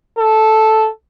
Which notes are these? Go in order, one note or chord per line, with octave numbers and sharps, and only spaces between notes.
A4